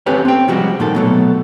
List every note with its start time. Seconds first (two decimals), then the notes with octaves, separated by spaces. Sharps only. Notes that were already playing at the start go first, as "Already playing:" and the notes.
0.06 C4 C#4 G4 A4 B4 C#5
0.25 C4 G5
0.48 C3 F3 G3 G#3 F#4 G4
0.80 A#2 D#3 A4
0.95 B2 F#3 A3